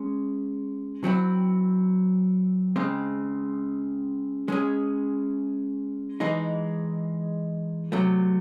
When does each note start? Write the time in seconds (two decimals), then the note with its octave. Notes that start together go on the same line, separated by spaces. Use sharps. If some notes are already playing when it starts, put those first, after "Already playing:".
Already playing: G#3 C#4
1.04 F#3 C4 E4
2.76 C#3 G#3 C4
4.48 G#3 C#4 G#4
6.20 E3 G#3 D#4
7.92 C3 F#3 A3